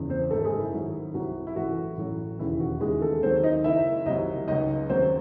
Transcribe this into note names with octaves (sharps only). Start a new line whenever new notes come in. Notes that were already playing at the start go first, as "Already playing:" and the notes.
Already playing: F#1 E2 C#3
C4 C5
G#1 F#2 D#3 A3 A4
G#3 G#4
E4
G#1 G#2 F#3
C2 C3 F#3 F#4
E4
A1 A2 E3 F#4
A1 A2 F#3
E1 D#2 C#3 E3 E4
F#4
D#2 C#3 E3 G#3 G#4
A3 A4
D#2 D#3 F#3 C4 C5
D#4 D#5
F#1 F#2 C#3 E4 E5
C2 C3 D#3 F#3 D#4 D#5
C#2 C#3 F#3 D#4 D#5
D#2 C#3 F#3 C4 C5